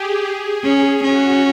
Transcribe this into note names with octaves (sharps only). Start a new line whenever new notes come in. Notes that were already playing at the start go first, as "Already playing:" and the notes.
Already playing: G4 G#4
G#4
C#4 G#4
C#4 F#4